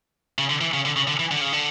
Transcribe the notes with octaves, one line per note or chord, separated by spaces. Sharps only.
C#3
D3
E3
C#3
D3
C#3
D3
E3
D3
C#3
D3